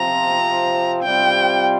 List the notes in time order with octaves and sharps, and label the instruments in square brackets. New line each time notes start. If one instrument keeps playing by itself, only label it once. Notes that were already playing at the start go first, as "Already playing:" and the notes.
Already playing: [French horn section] C3 F3 C4 F4 [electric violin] A#5
[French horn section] C3 G3 C4 F4 [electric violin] G5